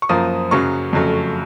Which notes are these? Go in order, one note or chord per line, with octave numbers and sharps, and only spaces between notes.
C#6
F#2 F3 A#3 D#6
F#2 C#3 F#3 A#3 C#6
F2 C#3 F#3 A3